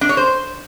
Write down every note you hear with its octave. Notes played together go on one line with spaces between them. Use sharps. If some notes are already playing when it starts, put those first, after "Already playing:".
D4
C#5
C5